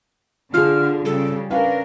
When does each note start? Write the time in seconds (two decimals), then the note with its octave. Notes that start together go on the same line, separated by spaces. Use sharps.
0.54 D3 F4 G#4 F6
1.05 C#3 G3 A4
1.51 C#4 D4 A#4 B4 F5